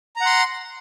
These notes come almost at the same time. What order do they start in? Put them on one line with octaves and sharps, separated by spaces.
A#5 F#5 C6